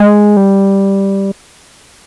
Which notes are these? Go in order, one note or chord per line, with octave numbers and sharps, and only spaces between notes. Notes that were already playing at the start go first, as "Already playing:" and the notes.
Already playing: G#3
G3